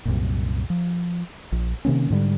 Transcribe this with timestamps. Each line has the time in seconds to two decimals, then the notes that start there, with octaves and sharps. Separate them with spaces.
0.05 C2 F#2 A#2
0.70 F3
1.52 A#1
1.85 C3 D#3 A#3 C#4
2.10 G#2 D3 G3